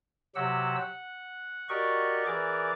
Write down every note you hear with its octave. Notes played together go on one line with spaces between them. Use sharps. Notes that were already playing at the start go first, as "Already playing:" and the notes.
C3 F#3 G4 F#5 E6
F#5
F#4 G4 A#4 D5 D#5 C#6
E3 G#4 A#4 D5 D6